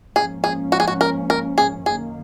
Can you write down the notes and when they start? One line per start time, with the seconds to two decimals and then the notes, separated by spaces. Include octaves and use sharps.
0.15 G#2 F3 A#3 C#4 G#4
0.44 G#4
0.72 F#4
0.80 G#4
0.88 F#4
1.01 A#4
1.30 A#4
1.58 G#4
1.86 F#2 D#3 A#3 G#4